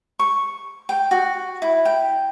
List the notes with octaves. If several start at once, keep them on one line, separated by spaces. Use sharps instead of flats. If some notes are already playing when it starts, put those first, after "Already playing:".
C#6
G5
F#4
E4
G5